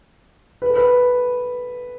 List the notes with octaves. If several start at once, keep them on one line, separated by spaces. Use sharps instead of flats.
B4
A4
B4